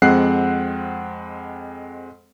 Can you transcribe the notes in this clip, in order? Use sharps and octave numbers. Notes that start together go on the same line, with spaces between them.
F2 G#3 C4 F#5 F#6 C7